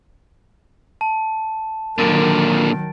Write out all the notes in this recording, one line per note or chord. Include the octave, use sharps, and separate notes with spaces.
A5
A#2 D3 D#3 F#3 A#4 A6 D7